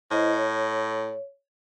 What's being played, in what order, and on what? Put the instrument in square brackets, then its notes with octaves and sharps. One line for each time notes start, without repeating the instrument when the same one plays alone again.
[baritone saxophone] A2 [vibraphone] E4 C5 D#5
[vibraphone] C#5